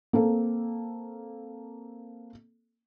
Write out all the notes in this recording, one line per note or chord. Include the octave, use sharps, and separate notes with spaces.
A#3 C4 A4